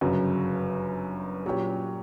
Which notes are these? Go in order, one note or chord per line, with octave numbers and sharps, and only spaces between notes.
G1 F#2 C#3 F#3
A#2 F#3 C#4 G4